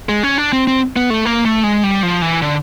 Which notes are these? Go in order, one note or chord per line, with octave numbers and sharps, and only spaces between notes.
G#3
C#4
D4
C4
C4
B3
A3
A#3
A3
G#3
G3
F3
E3
D3